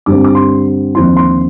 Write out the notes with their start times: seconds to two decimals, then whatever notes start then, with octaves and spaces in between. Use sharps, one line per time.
0.06 G2 D3 G3 C4 D6
0.24 D6
0.35 C6
0.95 D#2 D3 F3 C4 F4 C6
1.17 C6